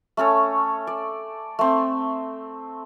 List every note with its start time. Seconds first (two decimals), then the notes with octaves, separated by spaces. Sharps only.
0.17 A3 C#4 A4 C#5
0.87 D5
1.59 A3 C4